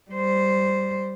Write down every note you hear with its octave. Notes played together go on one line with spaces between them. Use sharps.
G3 C5